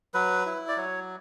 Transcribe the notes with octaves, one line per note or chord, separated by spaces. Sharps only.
F#3 B4
E4
D5
F#3 C#5